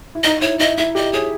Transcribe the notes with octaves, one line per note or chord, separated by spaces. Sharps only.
E4
D#4 D#5
E4 C#5
E4 D#5
E4 E5
G4 D#5
G#4 C#5